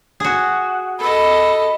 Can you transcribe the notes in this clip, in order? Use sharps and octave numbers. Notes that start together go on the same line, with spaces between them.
F#4 G#4
A4 D#5 B5